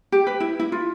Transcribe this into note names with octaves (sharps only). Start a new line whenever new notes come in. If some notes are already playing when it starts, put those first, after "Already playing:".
G4
B4
E4
E4
F4